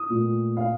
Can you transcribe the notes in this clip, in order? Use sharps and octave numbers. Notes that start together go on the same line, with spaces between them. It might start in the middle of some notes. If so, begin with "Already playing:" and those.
Already playing: D#6
A#2 A3
F5